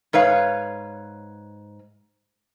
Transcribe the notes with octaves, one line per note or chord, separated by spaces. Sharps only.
G#2 B4 C#5 F5